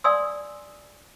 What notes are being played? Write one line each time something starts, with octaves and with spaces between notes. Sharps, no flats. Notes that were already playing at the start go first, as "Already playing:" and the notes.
D5 F5 G#5 C6 D#6 E6